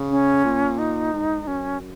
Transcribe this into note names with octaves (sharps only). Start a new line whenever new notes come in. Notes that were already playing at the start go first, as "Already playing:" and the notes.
Already playing: C#3
C#4
A#2
D#4
G#2
F#2 C#4